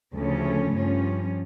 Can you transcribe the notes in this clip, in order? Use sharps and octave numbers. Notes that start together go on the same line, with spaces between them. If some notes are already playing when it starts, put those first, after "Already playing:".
D2 C#3 F3 A3 C#4
G2 F3 C#4